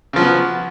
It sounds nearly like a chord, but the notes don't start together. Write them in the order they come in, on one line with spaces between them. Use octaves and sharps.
C#3 F3 F#3 B3